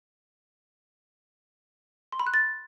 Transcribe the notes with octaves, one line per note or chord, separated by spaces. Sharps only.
C6
B5
F#6
A6